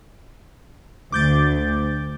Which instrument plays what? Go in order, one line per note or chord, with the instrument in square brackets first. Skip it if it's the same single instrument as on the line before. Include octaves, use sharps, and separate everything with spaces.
[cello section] D2 [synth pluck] D6 G6 A6